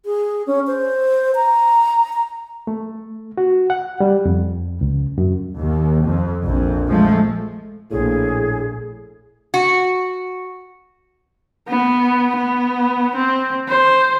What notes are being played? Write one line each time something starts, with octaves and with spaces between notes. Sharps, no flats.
G#4
C#4
C5
A#5
A#5
A3
F#4
F#5
G3
F2
C#2
F#2
D#2
F2
A#1 F2
F3 G#3 A3
A#1 A2 G#4
F#4
B3
B3
C4
C5